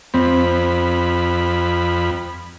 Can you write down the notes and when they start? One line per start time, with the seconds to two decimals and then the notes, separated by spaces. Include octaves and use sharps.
0.14 F2 C4 B5